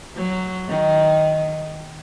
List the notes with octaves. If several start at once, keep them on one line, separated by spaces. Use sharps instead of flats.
F#3
D#3